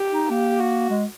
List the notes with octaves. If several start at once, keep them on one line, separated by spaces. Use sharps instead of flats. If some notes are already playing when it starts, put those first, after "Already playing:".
Already playing: G4
D#4
A#3 G4
F#4
G#3